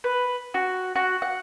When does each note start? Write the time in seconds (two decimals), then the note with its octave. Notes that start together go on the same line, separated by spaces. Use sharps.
0.04 B4
0.54 F#4
0.96 F#4
1.22 F#5